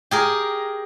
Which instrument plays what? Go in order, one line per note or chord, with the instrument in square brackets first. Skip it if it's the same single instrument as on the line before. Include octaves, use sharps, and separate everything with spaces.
[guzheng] G4 G#4 A#4